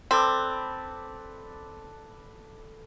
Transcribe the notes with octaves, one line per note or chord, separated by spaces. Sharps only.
C4 A4 B4 D5